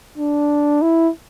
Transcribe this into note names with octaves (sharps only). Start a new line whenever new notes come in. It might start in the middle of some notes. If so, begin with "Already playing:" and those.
D4
E4